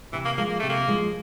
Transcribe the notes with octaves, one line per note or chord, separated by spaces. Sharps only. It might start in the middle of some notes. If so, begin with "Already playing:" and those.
C3 E3
A#3
F3 G#3 A#3
A#3
C3 A3
A#3
F3 G#3